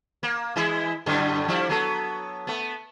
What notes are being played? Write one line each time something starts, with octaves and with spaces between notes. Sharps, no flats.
A#3
E3 G#3 E4
F#2 A2 D3
F3 G3 E4
F#3 B3 A4
A3 B3